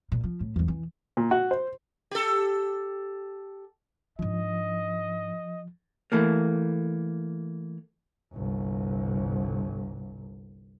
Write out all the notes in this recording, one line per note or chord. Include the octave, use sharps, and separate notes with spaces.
A#2
F3
A2
E2 G2
E3
A#2
F#4
C5
G4 A4
G#2 F3 D4 D#5
E3 A3 A#3
G1 C2